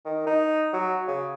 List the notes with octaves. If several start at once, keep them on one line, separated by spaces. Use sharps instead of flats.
D#3
D#4
F#3
C#3